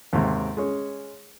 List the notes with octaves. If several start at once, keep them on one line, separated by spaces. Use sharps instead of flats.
D#2 G#2 C3
G#3 C#4